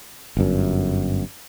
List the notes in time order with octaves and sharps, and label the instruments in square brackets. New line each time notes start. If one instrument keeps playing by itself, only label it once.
[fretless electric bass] G1 F#2